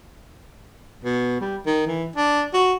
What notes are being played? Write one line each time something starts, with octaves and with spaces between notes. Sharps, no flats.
B2
G3
D#3
E3
D4
F#4